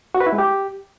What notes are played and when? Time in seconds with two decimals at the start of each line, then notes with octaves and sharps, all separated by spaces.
0.15 F#4
0.20 B4
0.26 E4
0.32 G#3
0.38 G4